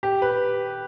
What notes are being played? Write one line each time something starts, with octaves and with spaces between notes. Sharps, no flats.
G4
B4